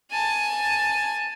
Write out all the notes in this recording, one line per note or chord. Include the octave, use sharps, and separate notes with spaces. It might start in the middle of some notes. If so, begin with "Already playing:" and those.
G#5 A5